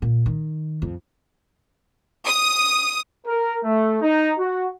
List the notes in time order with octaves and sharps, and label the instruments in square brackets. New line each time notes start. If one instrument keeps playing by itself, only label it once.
[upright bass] A#2
D#3
F2
[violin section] D#6
[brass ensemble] A#4
A3
D#4
F#4